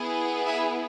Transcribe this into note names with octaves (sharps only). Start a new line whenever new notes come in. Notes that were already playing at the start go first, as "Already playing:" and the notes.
Already playing: B3 E4 G#4
E5 G#5